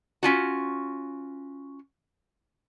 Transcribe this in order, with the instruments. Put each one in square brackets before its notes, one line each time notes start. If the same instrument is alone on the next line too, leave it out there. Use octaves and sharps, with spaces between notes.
[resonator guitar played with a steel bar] C#4 F4 F#4